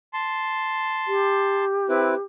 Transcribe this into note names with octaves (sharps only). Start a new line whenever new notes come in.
A5 C6
G4
C4 E4 B4